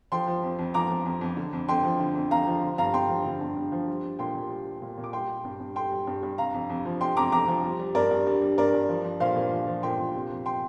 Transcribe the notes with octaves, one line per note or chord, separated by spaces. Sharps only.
F3 G5 C6
F3
F2
F2
F3 A#5 D6
F3
F2
F2
D3
F2
F2 G5 C6
F3
D3
F2
F2 F5 A#5
F3
D3
G2 F5 A#5
G2 G5 C6
F3
D3
G2
G2
F3
G3
G3
A#2 G5 C6
A#2
G3
G3
A#2
A#2
D6
G3 G5 C6
G3
G2
G2
G3 G5 C6
G3
G2
G2
C3 F5 A#5
F2
F2
F3
C3 G5 C6
F2 A#5 D6
F2 A#5 D6
F3
G3
G3
G2 A#4 D5
G2
G3
G3
G2 A#4 D5
G2
F3
F3
A#2 C5 F5
A#2
F3
F3
A#2 G5 C6
A#2
C3
F2
G5 C6